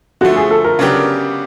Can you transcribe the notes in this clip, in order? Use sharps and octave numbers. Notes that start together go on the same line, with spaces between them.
D3 F3 A3 F#4
G#4
A4
A#4
C#3 F#3 B3 D4 G4